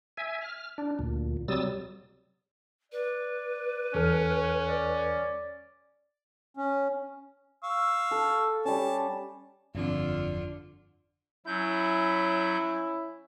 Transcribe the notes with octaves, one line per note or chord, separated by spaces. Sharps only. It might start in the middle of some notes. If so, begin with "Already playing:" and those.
E5 G#5
F6
D4
D2 A#2
C3 F#3 G3 D#6 E6 A6
B4 D5
E2 C#4 A4 F6
D5
C#4
F5 C#6 E6
A4
G3 C#4 A5
G1 F2 D3 F4
F#3 C#4 E4 G6